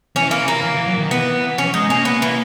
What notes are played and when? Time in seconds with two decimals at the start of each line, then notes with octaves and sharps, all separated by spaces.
0.16 E3 C#4
0.31 A#3
0.48 A#3
0.63 E3
0.75 E3
0.87 F#3
0.98 D#3
1.11 E3 B3
1.58 C#4
1.74 G#3 D#4
1.90 A#3 C#4
2.05 B3
2.22 E3